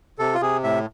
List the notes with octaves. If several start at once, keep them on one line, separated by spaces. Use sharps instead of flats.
C3 A4
F4
C3 G#4
A2 E5